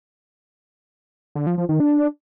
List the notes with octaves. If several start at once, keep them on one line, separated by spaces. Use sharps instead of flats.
D3
F3
F3
D#3
D4